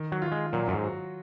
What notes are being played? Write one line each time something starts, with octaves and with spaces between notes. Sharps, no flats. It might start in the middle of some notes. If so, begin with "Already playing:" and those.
Already playing: D#3
F#3
F4
G#3
A#2 F#3
F#2
G#2
F#4